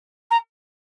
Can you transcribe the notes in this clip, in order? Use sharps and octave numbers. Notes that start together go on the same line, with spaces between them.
A#5